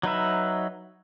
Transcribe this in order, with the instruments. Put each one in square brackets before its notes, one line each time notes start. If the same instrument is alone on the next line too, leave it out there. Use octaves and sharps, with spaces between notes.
[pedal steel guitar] F#3 D#4 B4 E5